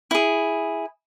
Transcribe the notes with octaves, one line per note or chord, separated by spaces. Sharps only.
E4 G#4